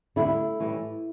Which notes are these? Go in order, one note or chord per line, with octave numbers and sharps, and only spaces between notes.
D2 D3 G3 E4
A2 E3 G3